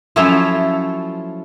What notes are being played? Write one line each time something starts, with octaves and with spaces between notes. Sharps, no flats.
F3 F#3 A3 C#4 E4 F4